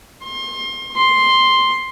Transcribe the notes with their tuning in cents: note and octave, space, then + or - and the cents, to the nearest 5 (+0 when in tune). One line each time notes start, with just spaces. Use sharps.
C6 +30
C6 +5